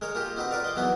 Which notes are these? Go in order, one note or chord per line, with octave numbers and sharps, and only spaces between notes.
G#3 A#4 C#5 G#5
A#3 F4 G4
C4 D#4 F#4 B4
F4 A#4 B4 D5 F5
D#5 C6 D6
E2 E3 F#3 B3 D#4